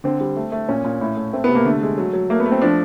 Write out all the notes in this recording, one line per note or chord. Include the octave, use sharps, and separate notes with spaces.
D3 C4
G3
A3
A3
A#2 C#4
A#2
A2
A3
A3 C4
B3
C3
A#3
D3 A3
G#3
F#3
F#3
A3 A#3
B3
A3
C4
F3 D4